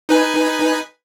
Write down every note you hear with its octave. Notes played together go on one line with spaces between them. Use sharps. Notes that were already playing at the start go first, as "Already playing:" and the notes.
D#4 B4 G#5